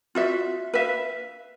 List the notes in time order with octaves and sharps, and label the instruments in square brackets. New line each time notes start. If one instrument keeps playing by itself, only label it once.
[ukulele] F4 F#4 E5
B4 E5 F5